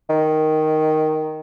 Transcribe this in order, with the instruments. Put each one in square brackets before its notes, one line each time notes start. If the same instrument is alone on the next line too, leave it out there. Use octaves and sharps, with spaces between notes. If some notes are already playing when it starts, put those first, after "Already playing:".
[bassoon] D#3